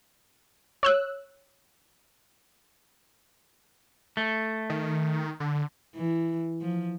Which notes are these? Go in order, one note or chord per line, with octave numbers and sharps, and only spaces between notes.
C#5 E6 F#6
A3
D#3
D3
D3
E3
F3